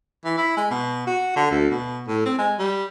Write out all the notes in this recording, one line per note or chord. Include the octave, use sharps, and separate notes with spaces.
E3
E4
G#3
B2
F#4
D3
D2
B2
A2
C4
G#3
G3